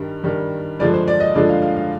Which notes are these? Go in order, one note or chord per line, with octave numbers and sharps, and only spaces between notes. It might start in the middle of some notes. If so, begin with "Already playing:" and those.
Already playing: G2 D#3 G3
G2 D#3 G3
G2 D3 F3 G#3 D5
C5
D5
D#5
G2 D3 F3 G#3 D5
F5
F5
F5